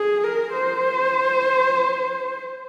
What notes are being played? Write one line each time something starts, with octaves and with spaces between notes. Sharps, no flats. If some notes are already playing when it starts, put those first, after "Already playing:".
Already playing: G#4
A#4
C5